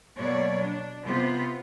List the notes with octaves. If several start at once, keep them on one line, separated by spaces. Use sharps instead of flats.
B2 F#3 A#3 C#5 D5
D4
C3 B3 F4